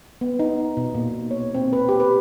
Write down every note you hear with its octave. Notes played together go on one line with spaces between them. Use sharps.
B3
D#4
B2
A#2
C#5
C4
B4
G4
B4